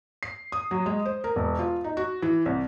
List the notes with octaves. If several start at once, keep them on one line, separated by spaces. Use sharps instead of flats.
C7
D#6
F#3
G#3
C5
A#4
E1
F4
D#4
F#4
E3
C2